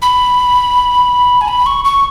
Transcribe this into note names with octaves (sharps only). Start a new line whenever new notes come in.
B5
G#5
B5
C#6
C#6